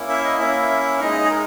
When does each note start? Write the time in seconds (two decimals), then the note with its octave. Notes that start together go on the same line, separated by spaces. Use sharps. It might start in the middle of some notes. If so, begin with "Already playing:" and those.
Already playing: A#3 C#4 E4
0.09 E5
0.24 D#5
0.39 A#3 C#4 E4 E5
1.00 G#3 D#4 D#5
1.24 G#4
1.31 A#4